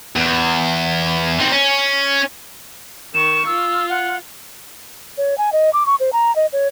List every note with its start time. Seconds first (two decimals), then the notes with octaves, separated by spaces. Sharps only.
0.16 E2
1.39 C4 D#4
1.52 C#4
3.14 D#3 C#6 E7
3.46 F4 E6
3.90 F#5
5.18 C#5
5.38 G#5
5.53 D#5
5.73 D6
5.86 C#6
6.00 C5
6.13 A#5
6.36 D#5
6.53 C#5